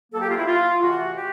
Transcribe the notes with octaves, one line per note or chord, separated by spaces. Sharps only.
B2 F#3 A#3 A4
G4
F4
E4
F4
F2 C3 E3 A3 F#4
G4